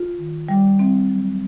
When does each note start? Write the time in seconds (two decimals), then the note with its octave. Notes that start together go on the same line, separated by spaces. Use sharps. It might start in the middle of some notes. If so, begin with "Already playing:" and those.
Already playing: F4
0.18 D#3
0.49 G3
0.79 C4
1.10 F#3